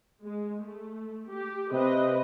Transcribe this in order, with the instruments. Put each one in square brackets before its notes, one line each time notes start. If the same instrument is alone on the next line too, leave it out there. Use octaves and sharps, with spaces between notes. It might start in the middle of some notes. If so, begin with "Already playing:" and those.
[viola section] G#3
A3
G4
[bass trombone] C3 [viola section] C4 B4 D#5